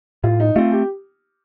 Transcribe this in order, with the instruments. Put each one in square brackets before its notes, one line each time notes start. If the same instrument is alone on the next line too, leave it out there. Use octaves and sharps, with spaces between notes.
[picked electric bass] A2 [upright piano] F4
[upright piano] D#4
[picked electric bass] A3 C4 [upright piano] F4
[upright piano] G4